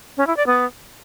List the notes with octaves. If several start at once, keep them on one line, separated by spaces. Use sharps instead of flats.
C#4
E4
D5
B3